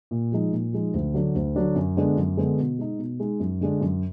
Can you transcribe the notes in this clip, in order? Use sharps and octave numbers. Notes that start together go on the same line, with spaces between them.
A#2
F3 G#3 D#4
A#2
F3 G#3 D#4
D2
D3 F#3 D4
D2
D3 F#3 D4
F#2
D3 G#3 B3 D4
F#2
D3 G#3 B3 D4
B2
G#3 D#4
B2
G#3 D#4
F#2
D3 G#3 D4
F#2